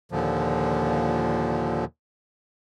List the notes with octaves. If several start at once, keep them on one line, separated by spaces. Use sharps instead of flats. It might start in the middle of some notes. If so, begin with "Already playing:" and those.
D#2 A#2 D3 F3